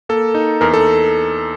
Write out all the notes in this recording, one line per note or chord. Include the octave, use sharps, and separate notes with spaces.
A#3 A4
D#4
E2 A#4
A4